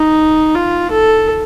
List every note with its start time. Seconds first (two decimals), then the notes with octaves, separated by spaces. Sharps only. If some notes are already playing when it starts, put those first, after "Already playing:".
Already playing: D#4
0.55 F4
0.91 A4